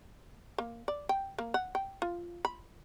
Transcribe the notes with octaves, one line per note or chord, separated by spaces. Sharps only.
A#3
D5
G5
A#3
F#5
G5
F4
B5